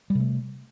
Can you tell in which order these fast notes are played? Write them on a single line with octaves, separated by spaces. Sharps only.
G3 C3 A3